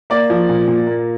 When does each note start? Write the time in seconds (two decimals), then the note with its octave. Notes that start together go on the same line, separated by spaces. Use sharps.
0.10 A#3 D5
0.30 F3
0.49 A#2
0.68 A#2
0.87 A#3